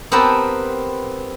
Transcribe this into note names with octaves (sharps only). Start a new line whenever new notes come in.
B3 C4 G4 A#4 B4 A5